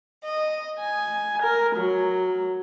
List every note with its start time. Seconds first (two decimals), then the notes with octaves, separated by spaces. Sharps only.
0.24 D#5
0.80 G#5
1.42 A#4
1.76 F#3